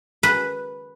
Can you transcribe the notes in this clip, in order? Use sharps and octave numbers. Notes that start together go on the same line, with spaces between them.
B4